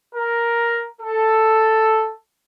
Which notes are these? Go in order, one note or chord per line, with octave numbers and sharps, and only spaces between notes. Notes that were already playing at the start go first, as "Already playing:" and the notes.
A#4
A4